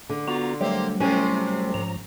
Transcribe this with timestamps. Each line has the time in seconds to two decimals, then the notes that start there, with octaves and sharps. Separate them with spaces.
0.09 D3
0.28 B3 F4 F#4 A#5
0.61 F#3 G3 A3 A#3 C4 G4
1.00 A2 C3 C4 C#4
1.74 G#2 F3 A#5